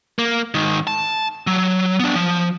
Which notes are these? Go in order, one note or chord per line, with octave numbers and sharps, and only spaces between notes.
A#3
G#2 D#3
A5
F#3
B3 D4
F3